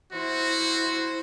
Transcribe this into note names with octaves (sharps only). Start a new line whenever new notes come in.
E4 F#4 C5